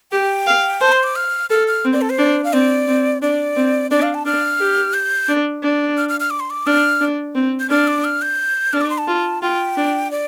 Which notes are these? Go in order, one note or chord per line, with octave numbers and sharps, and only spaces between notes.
G4 G5
F5
C5 A5
C6
D6
F6
A4 F6
F6
C4
D5
A4
C5
D4
F5
C4 D5
C4
D4 D5
C4
D4 D5
F5
A5
D4 F6
G4
G6
D4
D4
F6
F6
F6
D6
C6
D6
D4 F6
D4
C4
G6
D4 F6
D6
F6
G6
D4 F6
D6
C6
A5
F4
F4 G5
D4
D5